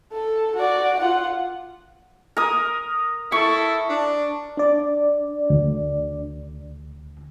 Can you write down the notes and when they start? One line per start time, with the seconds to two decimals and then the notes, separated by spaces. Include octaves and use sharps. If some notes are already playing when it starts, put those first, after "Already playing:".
0.13 A4
0.56 F#4 D5
1.00 F4 F#5
2.37 A#4 D#6
3.32 E4 A4 C#6
3.89 D4
4.57 D4 D5
5.50 D2